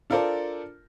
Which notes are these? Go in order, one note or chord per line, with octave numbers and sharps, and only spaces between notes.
D4 F4 A4 A#4 C5 D5